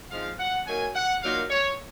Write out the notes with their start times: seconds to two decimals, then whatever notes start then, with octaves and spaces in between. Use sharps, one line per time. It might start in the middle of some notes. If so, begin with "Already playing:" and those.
0.11 F3 G#3 C4 D#4 F5
0.39 F#5
0.66 F#3 A#3 D#4 G#5
0.95 F#5
1.23 A#2 F#3 A#3 D#4 F5
1.50 C#5